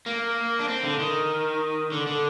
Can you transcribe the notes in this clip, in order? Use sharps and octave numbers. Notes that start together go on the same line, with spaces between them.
A#3
D4
C4
D3
D#3
D3
D3